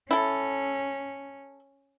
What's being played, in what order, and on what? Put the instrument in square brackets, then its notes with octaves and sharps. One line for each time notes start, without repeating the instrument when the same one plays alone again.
[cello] C#4 [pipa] E4 A4